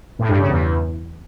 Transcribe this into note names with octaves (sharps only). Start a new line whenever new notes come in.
A2
G2
C#3
E2